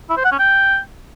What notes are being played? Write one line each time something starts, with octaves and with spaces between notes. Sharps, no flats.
E4
C5
F#5
C#4
G5